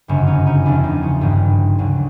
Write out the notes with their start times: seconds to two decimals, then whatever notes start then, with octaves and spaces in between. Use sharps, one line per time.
0.08 G1 F#2 C#3 F#3 B3 C#4
0.27 C#4 D#4
0.46 C#4 D#4
0.65 F#1 E2 C#3 F3 D4 E4
0.84 D#4 F4
1.03 C#4 D#4
1.21 G#1 G2 D#3 F#3
1.78 D2 C#3 F#3